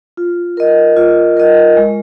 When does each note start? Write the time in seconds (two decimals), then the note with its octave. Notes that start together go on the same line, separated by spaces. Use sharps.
0.17 F4
0.57 A#4 D#5
0.97 F4
1.37 A#4 D#5
1.77 G#3